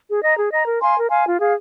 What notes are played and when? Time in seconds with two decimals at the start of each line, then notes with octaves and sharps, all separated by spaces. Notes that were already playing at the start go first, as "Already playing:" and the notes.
0.08 G#4
0.22 D#5 A#5
0.37 G#4
0.52 D#5 A#5
0.66 A#4
0.81 F5 G#5 C6
0.96 A#4
1.10 F5 G#5 C6
1.25 F4
1.39 G#4 F5